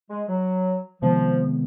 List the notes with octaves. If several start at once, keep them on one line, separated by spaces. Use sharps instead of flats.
G#3
F#3
C3 D#3 F3 G#3 B3